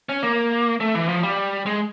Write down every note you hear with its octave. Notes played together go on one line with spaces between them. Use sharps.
C#4
A#3
A3
E3
F3
G3
G#3